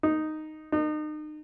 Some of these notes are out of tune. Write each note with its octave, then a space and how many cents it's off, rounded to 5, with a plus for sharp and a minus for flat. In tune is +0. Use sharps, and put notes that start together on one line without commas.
D#4 -5
D#4 -35